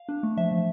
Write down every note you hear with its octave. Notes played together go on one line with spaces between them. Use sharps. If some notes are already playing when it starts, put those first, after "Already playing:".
Already playing: F5
D4
A3
F3 E5
F3